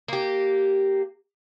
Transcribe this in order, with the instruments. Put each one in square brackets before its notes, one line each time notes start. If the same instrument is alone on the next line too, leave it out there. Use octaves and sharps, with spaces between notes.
[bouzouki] A#3 G4